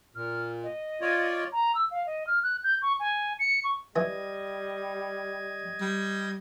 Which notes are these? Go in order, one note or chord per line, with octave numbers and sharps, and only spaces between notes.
A#2 F6
D#5
F4 C#5 D5
A#5
E6
F5
D#5
F6
F#6
G6
C#6
G#5
C#7
C#6
E3 G3 D#5 G#5 G#6
G3